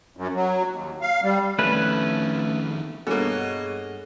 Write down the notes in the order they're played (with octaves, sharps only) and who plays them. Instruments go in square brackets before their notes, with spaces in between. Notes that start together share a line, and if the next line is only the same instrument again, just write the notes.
[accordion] F#2
F#3
D#2
F5
G3
[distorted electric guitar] F2 D#3 [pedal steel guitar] A3 C#4 B4
[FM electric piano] G2 G#4 F#5 [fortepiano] B2 A#3 [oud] A4 [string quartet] C#5 D#5